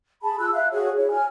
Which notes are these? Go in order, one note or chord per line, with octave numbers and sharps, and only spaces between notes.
G#4 A5 B5
F4 E6 F#6
E5 F5 F#6
F#4 G#4 C#5
E4 C#5
G#5 F6